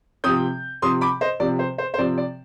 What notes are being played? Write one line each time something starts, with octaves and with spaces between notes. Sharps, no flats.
C3 F3 C4 D#6 G6
C3 F3 C4 C6 D#6
B5 D6
C5 D#5
C3 F3 C4 D5
C5
C5
C5
C3 F3 C4 D5
D5